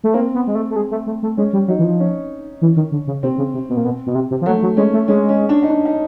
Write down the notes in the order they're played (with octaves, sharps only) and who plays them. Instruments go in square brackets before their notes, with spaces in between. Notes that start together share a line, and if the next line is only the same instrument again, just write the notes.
[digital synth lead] A3
[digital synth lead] A#3 [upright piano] C4
[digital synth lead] B3
G#3
A3
A3
G#3
A3
A3
A3
[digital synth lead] G#3 [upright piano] C#4
[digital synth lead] G3
[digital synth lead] F#3 [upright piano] D#4
[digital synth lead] E3
F3
[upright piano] C#4
[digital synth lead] E3
D#3
D3
C#3
[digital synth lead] C3 [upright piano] C4
[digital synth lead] C#3
C3
B2
A#2
B2
B2
C3
C3
F3
[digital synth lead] F#3 [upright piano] A3
[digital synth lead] F#3
[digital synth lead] G#3 [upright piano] C#4
[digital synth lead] A3
[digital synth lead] G#3 [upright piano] C#4
[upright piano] C#4
D4
D#4
D4
D#4